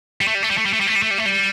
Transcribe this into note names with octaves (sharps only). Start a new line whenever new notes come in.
G3
A3
G3
A3
G3
A3
G3
A3
G3
A3
G3
A3
G3
A3
G3